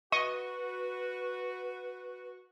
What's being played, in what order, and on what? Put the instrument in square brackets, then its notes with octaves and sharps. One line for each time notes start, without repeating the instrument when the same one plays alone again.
[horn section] F#4 [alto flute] B4 [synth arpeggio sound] D#5 [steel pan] C#6